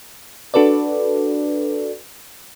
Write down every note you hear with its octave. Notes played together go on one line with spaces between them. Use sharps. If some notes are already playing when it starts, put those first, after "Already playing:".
D4 F#4 A4 B4 D5